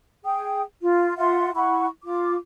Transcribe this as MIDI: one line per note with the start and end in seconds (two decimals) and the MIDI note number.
0.24 0.62 68
0.24 0.62 79
0.24 0.62 87
0.81 1.13 65
1.17 1.53 65
1.17 1.53 76
1.17 1.53 78
1.17 1.53 84
1.55 1.86 64
1.55 1.86 78
1.55 1.86 83
1.55 1.86 85
2.04 2.35 65
2.04 2.35 86